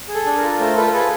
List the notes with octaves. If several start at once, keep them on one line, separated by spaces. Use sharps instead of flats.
G#4
A4
D4
F4 A#4
A3 A#4 C5
F4 A4 B4
G#4 A4 B4